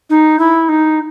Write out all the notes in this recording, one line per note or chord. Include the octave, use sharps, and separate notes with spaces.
D#4
E4
D#4